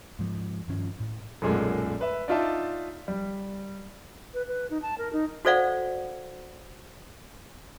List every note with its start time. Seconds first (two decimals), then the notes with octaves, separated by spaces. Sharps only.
0.19 G#2 F3
0.68 G2 D#3 F3 C#4
1.00 A2
1.42 B1 F#2 A#2 G#3 A3
2.01 B4 E5
2.28 D4 D#4 F4 D5 E5 A5
3.08 G3
4.34 B4
4.48 B4
4.70 D#4
4.82 A5
4.98 A#4
5.13 D#4
5.45 F#4 A4 C5 D5 F5 F#5